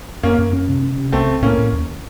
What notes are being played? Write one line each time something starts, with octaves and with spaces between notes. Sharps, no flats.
F#2 A#3 C#4
A#3
F#2
C#4
C3
C#4
C3
C2 A3 C4
C2
A2 A#3 C#4
A2
D#2